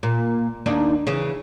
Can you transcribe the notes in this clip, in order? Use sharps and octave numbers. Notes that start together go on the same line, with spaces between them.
A#2
D#2 D4 D#4
C#3 E3